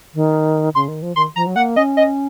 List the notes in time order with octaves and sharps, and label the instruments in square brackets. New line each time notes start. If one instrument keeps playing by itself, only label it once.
[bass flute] D#3
[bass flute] C#3 [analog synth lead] C6
[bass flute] D#3
F3
[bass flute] D#3 [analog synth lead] C6
[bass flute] F3 [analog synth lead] A#5
[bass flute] F#3
[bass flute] A#3 [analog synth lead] F#5
[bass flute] C#4 [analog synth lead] D#5
[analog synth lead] D#5